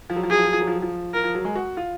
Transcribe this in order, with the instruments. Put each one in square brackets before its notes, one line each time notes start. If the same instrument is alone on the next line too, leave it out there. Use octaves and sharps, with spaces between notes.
[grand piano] F3
F#3
F3
[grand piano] F#3 [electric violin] G#4
[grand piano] F3
F#3
F3
F#3
F3
F#3
F3
[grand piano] F3 [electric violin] A#4
[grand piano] F3
F#3
G#3
F#4
F4